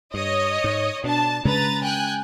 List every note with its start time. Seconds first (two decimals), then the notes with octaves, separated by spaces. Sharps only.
0.14 G2 C#5 D#5
0.64 G#2
1.04 B2 D4 A5
1.45 C#3 G#3 C#4 B4 A#5 A6
1.83 G5 G#5 F#6